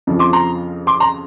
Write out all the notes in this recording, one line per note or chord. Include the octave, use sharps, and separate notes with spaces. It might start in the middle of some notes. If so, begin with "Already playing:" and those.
F2 C#3 F3
C6 D6
A#5 C6
C6 D6
A#5 C6